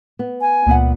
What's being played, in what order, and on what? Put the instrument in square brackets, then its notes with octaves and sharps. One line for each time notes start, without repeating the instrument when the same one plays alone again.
[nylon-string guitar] B3
[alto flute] G#5
[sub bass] C#2 [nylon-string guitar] A#2 B3 F#5